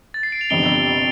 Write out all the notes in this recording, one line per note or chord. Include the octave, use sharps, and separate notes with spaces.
A6
C7
D7
F7
G1 F2 C3 D7 G7